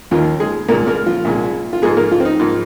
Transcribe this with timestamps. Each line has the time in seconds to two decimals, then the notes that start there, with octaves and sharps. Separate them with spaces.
0.11 D#2 D#3 F3 A#3 F4
0.40 G#3 G#4
0.68 C2 A#2 G#3 A#3 A#4
0.87 A#3 A#4
1.06 F3 F4
1.25 C2 A#2 G#3
1.73 F4
1.82 G#2 F3 G#3 A#3 G#4
1.97 A#3 A#4
2.11 F3 F4
2.20 C4
2.25 D#4
2.40 G#2 F3 A#3